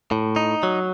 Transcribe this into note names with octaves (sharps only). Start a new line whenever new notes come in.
A2
D#4
F#3